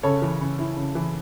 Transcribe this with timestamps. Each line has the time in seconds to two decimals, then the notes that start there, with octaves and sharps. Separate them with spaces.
0.03 C#3 A4 C#5
0.22 E3
0.40 C#3
0.59 E4
0.77 C#3
0.95 E3